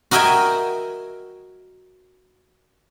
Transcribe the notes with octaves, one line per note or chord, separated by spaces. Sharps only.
F#4 A#4 D#5 E5 G5 G#5